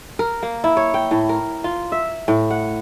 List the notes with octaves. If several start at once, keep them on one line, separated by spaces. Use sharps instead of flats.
A#4
A#3
E4
C#5
G5
A2
A#4
F4
E5
A2
F#5